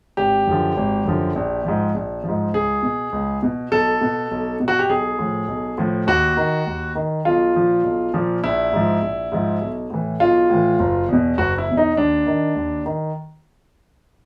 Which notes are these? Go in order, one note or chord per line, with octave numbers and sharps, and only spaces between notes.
G#1 G4
F#2 D3 F3
G#1
F#2 D3 F3
A#1
G#2 F3
A#1
G#2 F3
C#2 G#4
B2
C#2
B2
B1 A4
B2
B1
B2
F#4
G4
B1 G#4
A2 F3
B1
A2 F3
D#2 F#4
D#3
D#2
D#3
B1 F4
A#2 F3
B1
A#2 F3
A#1 E4
G#2 F3
A#1
G#2 F3
B1
A2 E3
B1 F4
A2 E3
F#1
E2 B2
F#1 F#4
E4
E2 B2
D#4
D#2 D4
D#3
D#2
D#3